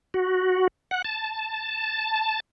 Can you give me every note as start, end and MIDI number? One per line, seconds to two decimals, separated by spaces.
0.14 0.68 66
0.91 1.02 78
1.05 2.40 81